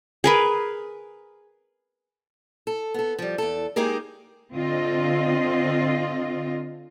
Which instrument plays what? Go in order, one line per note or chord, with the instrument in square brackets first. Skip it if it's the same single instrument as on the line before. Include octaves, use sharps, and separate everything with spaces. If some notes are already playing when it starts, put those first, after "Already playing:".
[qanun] G#4 A#4 B4
[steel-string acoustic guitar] A4
B3 A4
F3 G3
E2 A4
G#3 A#3 D#4 G4 G#4 A#4
[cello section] D3 C4 F4 D#5